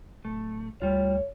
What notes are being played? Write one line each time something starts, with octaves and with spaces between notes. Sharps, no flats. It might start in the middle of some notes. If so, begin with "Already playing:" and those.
D1 A3
D2 G3 F4 C#5